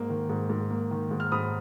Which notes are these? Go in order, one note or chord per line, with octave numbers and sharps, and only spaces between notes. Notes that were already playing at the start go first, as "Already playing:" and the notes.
Already playing: G#2 A#3
D#3
G#2
G#2
A#3
D#3
G#2
F6
G#2 B5 D#6